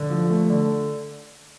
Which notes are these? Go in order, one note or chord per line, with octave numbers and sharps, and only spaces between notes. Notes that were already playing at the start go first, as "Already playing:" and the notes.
Already playing: D3
F3
A3
D3